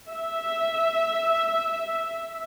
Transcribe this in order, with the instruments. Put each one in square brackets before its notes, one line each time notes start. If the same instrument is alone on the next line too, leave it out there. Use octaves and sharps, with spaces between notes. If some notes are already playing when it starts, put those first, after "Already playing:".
[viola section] E5